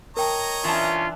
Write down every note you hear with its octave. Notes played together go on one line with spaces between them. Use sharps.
A#4 C#5 D#5 G5 A5 A#5
E3 C#4 D4 F4